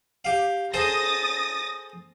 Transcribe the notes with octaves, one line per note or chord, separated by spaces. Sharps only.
G4 F5
G#4 A4 C5 D#6 A6 A#6